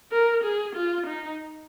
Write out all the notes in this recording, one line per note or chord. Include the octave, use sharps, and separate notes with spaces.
A#4
G#4
F4
D#4